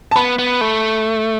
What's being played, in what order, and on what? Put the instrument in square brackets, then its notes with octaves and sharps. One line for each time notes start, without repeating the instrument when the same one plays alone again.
[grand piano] A5
[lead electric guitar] B3 [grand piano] B5
[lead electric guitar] B3
A3